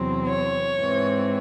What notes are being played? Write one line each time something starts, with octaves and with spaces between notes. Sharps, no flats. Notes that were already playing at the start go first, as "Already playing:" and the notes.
Already playing: E2 C3 F#3 C4
C#5
G#2 E3 C4